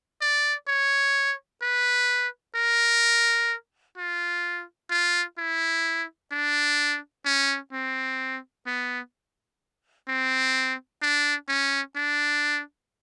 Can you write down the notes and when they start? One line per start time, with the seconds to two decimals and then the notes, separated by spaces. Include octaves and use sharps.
0.21 D5
0.68 C#5
1.62 B4
2.55 A#4
3.97 F4
4.90 F4
5.38 E4
6.32 D4
7.25 C#4
7.73 C4
8.67 B3
10.08 C4
11.02 D4
11.48 C#4
11.96 D4